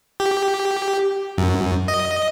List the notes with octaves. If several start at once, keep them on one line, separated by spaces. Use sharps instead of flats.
G4
F#2
D#5